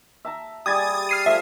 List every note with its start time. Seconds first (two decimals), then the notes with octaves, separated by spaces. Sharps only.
0.25 E5 A5 A#5
0.66 G3 G4 G#4 D#6 G#6 A6
1.09 F6 C7 D#7
1.26 F3 A3 E5